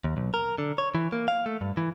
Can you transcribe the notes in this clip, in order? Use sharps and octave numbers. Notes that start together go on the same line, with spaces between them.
D#2
B1
A#4
D3
C#5
E3
A#3
F5
A3
G2
E3